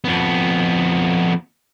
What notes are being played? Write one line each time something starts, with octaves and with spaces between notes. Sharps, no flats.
F2 B3